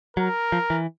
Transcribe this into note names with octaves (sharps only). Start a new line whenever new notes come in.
F#3 A#4
F3
E3